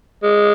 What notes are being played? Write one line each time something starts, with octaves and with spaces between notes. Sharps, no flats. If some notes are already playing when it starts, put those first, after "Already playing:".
G#3